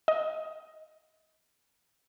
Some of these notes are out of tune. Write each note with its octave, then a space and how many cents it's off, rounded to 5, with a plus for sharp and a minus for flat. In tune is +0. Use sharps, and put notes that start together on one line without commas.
D#5 +20